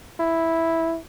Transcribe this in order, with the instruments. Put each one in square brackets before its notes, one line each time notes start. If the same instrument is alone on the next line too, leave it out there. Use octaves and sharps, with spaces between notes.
[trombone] E4